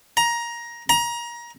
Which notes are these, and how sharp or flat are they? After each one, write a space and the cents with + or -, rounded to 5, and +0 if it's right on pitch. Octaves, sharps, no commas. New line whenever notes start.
A#5 +15
A#5 +25